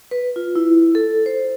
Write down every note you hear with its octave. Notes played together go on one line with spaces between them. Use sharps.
B4
F4
E4
A4
C5